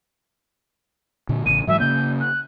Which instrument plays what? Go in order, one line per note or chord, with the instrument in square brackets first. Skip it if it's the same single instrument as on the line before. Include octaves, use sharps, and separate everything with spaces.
[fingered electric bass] A#2 D3
[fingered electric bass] A1 C#3 [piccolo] D#7
[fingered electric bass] G#2 E3 F#3 [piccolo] E5
[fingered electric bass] C#3 A#3 [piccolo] G6
[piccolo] F#6